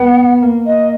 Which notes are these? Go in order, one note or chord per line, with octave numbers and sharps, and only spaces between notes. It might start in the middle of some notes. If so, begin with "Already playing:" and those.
Already playing: B3 F#5
A#3
D#5